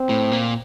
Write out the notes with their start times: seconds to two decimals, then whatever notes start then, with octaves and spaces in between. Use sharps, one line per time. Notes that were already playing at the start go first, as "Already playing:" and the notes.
Already playing: C4
0.09 A2
0.31 A#2